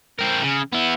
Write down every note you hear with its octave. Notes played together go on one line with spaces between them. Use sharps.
C4 A#4
C#3
B3 E4